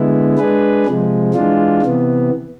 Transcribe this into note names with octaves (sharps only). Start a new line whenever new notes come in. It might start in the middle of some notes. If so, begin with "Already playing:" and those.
Already playing: D3 G#3 B3 E4
G#3 D4 G#4 B4
C3 F3 G#3
E3 G#3 D4 F4
C3 E3 B3